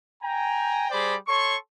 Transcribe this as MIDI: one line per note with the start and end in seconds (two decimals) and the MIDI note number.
0.23 0.88 79
0.23 0.88 80
0.23 0.88 82
0.91 1.16 55
0.91 1.16 68
0.91 1.16 72
0.91 1.16 74
0.91 1.16 83
0.91 1.16 86
1.27 1.56 69
1.27 1.56 73
1.27 1.56 84
1.27 1.56 85